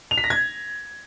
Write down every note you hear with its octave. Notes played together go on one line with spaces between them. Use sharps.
F7
B6
A#6
G#6